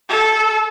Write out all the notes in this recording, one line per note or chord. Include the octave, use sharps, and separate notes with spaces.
A4